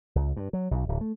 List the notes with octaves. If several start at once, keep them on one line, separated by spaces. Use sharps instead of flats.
C#2
G2
F#3
B1
D1
A3